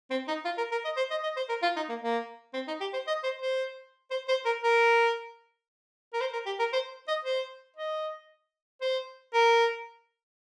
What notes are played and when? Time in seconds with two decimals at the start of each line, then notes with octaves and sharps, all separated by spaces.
0.10 C4
0.28 D#4
0.45 F4
0.58 A#4
0.71 A#4
0.85 D#5
0.97 C5
1.11 D#5
1.23 D#5
1.36 C5
1.49 A#4
1.62 F4
1.76 D#4
1.89 A#3
2.02 A#3
2.54 C4
2.67 D#4
2.81 G4
2.93 C5
3.07 D#5
3.23 C5
3.42 C5
4.11 C5
4.28 C5
4.45 A#4
4.64 A#4
6.13 A#4
6.21 C5
6.33 A#4
6.46 G4
6.59 A#4
6.73 C5
7.08 D#5
7.24 C5
7.77 D#5
8.81 C5
9.34 A#4